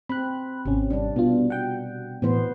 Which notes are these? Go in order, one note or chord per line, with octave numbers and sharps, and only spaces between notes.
C4 B5 F#6
G#1 C3 C#4
G3 D4
B2 B3 D4 F4
F#5 G5
A2 E3 B3 C5